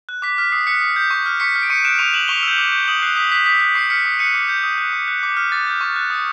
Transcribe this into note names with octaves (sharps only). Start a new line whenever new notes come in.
F#6
D6 B6
F6 B6
D#6 C7
F#6 B6 C#7
D#6
G6
C#6
F6
C#6 B6 C#7
F6
D7
C#6 C#7 D#7
F#6 D7 E7
C#6 D#7 F7
F#6 E7 F#7
C#6 F7 G7
E6 G6
D6
G6
D#6 E7 F#7
F#6 C7
D#6 B6
F#6 B6
D#6 B6
F#6 B6
C#6 C7
F6 B6 C#7
D#6
F#6 C#7 D#7
D6
G6
D#6
F#6
D6
F#6
D6
F6
D6 A6
G6
C#6
F#6
D#6